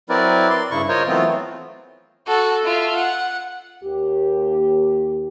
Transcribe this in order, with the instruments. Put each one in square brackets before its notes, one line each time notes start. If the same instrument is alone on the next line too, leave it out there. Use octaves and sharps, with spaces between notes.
[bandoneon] F#3 C4 E4 A#4 B4 D5
D5 C6
G2 C#3 E4 C#6
F4 A#4 C5 C#5 D#5
E3 F#3 A3 B3 C4 F4
[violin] F#4 A4
F4 E5
F#5
[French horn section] D#2 G4